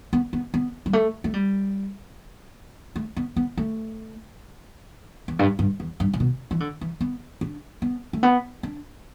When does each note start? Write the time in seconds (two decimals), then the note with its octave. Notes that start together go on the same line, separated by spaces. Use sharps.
0.13 B3
0.33 B3
0.54 B3
0.86 G3
0.93 A3
1.24 A3
1.34 G3
2.96 A3
3.16 B3
3.36 B3
3.58 A3
5.28 E2
5.39 G2
5.59 G2
5.80 E2
6.00 G2
6.13 A2
6.20 B2
6.51 E3
6.60 D3
6.81 E3
7.01 B3
7.41 D4
7.82 B3
8.13 A3
8.23 B3
8.63 D4